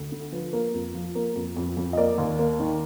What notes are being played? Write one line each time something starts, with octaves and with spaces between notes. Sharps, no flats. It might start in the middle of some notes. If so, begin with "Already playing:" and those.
Already playing: D2
D3
F3 B4
A#3
F2
F3
A#3
F2
F2
F2
D#5
A#3 D5
D#2
A#3
D#3